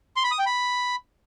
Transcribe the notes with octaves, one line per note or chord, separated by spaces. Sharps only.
C6
B5
D#6
G5
B5